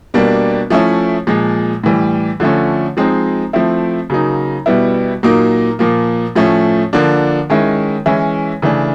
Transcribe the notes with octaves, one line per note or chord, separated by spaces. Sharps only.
B2 G3 A#3 D4
F3 A3 C#4 E4
A#2 F3 G#3
A2 E3 G3
D3 F3 A3 C#4
F3 G#3 C4 D#4
F3 A3 C4 E4
C#3 F#3 A#3 D#4
B2 G3 B3 E4
A#2 F#3 A#3 D#4
A#2 F3 A#3
A2 F3 A3 C#4
D3 F3 A#3 D4
D#3 G#3 C#4 E4
E3 G#3 C#4 E4
C#3 E3 A3 D4